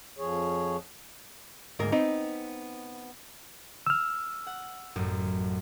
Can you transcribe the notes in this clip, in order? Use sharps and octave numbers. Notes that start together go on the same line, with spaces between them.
F2 F3 G#4 C#5
D2 G#2 A#3 A#4
B3 C4 D#4
E6 F6
F#5
A1 F#2